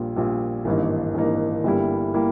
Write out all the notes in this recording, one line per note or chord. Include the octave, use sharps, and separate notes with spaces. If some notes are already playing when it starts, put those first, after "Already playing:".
Already playing: A#1 A#2 G3
A#1 A#2 G3
G#1 G2 E3 A#3 D#4
G#1 G2 E3 A#3 D#4
G1 G2 G3 A#3 E4
G3 A#3 E4